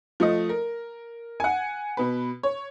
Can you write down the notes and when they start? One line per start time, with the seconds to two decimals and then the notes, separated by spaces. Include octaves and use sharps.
0.20 F3 A3 D#5
0.49 A#4
1.40 F#5 G#5
1.97 B2 B4
2.43 C#5